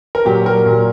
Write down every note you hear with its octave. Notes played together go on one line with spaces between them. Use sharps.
A#4
A#2 F#3 G4
A#4
A#2 F#3